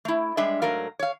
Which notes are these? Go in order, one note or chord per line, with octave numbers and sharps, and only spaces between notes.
A3 E4
G3 G#3 D4 E5
G#2 F#3 A3 A#4 F5
C#5 F5